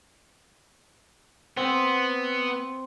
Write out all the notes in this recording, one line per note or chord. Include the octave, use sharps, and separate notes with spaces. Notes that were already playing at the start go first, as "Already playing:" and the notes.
B3 C4